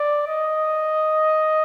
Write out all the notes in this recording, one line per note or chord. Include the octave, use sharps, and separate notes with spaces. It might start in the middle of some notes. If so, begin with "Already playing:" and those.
Already playing: D5
D#5